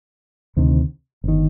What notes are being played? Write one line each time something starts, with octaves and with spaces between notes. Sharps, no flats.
D2 C3 D#3
G1 D#3